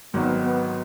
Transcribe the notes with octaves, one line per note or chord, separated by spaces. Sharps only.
G#1 G#2 D#3 F#3 B3
B3